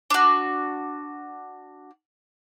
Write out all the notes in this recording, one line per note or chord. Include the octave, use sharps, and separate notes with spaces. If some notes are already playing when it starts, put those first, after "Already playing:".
D4 F#4